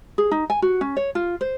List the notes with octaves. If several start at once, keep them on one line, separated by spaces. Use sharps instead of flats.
G#4
D#4
G#5
F#4
C#4
C#5
F4
C5